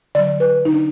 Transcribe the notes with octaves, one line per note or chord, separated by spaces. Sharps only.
D3 F#3 D5
B4
D3 F#3 D4 D#4